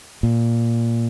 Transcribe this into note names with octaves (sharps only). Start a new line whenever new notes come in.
A#2